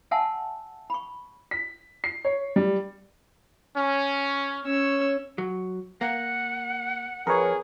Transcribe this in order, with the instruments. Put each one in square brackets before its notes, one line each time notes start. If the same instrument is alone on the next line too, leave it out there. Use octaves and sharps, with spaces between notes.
[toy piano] E5 F#5 G#5 A5 C6 E6
B5 C#6
[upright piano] B6
C7
C#5
G3
[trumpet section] C#4
[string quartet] C#4 C#5 E6
[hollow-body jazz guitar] F#3
[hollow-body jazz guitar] A#3 [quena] F#5
[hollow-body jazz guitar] F2 [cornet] G#4 [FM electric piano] A#4 B4 C#5